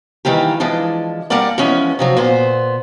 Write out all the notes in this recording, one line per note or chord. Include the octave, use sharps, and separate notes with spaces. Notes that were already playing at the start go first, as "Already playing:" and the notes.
D#3 E3 G3 A#3 G4
E3 F3 G#3 D4
G3 A#3 D4 A#4 D5 F#5
E3 F3 G#3 B3 C#4
C3 F3 F#3
A#2 B3 C5